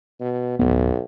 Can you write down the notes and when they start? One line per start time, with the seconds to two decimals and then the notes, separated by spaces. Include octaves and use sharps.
0.20 B2
0.59 D1 B1 E2 B3